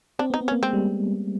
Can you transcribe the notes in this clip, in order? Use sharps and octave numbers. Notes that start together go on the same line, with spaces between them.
C4 D4
B3
D#4
B3
C#4
A#3
G#3 C4
G3